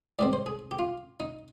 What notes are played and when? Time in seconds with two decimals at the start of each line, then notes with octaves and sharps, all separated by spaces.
0.19 G#2 D#3 G3 C4 D5
0.33 C5
0.46 G#4
0.71 G4
0.79 F4
1.20 D#4